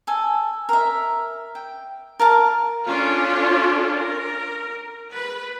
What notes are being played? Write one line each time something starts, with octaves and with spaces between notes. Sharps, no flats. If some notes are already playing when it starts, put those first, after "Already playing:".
A4 G#5
A#4 E5
G5
A#4 F5 A5 A#5
C#4 D4 F4 A4
A#4
B4